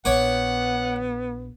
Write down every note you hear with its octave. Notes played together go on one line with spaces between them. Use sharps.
A#1 B3 C#5 F#5 D6